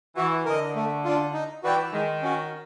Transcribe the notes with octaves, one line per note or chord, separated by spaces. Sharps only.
E3 F#4
D3 A#4 D#5
A3
D4 F4
D#4
E3 F#4 B4 D5 G5
D#3 G#3
C#4 F#4